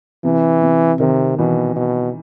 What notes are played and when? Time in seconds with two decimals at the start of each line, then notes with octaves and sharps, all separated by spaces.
0.24 C3 E3
0.62 C3
0.99 C3 D#3
1.38 B2 E3
1.76 B2